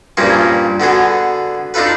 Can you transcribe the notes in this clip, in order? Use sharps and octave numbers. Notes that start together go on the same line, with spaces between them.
G2 A#2 F3 A#3 C#4
D3 B3 F#4 G#4
D4 D#4 F4 A4 B4